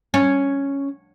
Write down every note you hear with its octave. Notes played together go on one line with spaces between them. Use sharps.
C#4